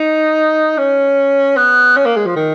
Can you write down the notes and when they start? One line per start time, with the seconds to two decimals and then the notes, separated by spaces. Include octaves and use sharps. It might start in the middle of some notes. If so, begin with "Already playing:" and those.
Already playing: D#4
0.78 C#4
1.57 B3
1.97 C#4
2.06 A#3
2.16 G#3
2.26 F3
2.36 D#3